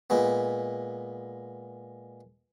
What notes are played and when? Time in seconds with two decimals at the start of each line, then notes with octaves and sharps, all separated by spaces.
0.10 A#2 G#3 B3